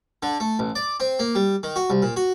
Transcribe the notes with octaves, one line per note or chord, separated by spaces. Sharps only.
D3
A3
A1
D5
C4
A#3
G3
D#3
F#4
C2
A#2
F#4